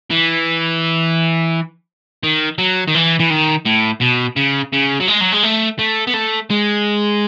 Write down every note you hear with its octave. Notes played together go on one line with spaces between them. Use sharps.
E3
D#3
F#3
D#3
E3
E3
D#3
A2
B2
C#3
C#3
F#3
G#3
F#3
G#3
A3
A3
B3
A3
G#3